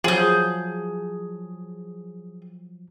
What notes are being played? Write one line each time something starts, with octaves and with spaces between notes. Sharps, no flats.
F3 F#3 G#4 G6